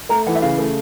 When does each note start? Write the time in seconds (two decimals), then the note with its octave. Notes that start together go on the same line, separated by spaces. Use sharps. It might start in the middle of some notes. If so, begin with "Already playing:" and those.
0.09 A3 A#5
0.27 E3 F#5
0.35 E5
0.42 C#3 F5
0.58 A3